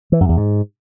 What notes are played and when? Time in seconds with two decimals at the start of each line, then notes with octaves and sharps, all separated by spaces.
0.12 E3
0.20 F#2
0.29 E2
0.37 G#2